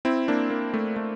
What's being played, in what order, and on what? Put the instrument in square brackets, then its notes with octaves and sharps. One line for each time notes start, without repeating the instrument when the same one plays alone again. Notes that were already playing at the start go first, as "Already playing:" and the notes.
[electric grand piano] C4 E4
A#3 D4
A#3
A3
A3